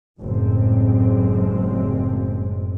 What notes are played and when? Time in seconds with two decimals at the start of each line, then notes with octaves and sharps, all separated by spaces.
0.19 F#1 F#2 A2 G3 G#3 C4